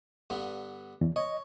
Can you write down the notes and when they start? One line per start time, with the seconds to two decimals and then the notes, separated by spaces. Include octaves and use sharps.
0.30 G2 D3 B3
1.01 E2
1.16 C#5 D#5